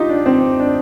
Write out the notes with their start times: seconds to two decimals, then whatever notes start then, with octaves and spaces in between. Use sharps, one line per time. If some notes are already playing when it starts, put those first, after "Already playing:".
Already playing: D#4 F4 G4
0.09 D4
0.26 C4
0.59 D4